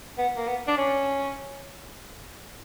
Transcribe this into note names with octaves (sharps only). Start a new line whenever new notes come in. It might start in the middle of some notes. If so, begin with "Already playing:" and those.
B3
A#3
B3
D4
C#4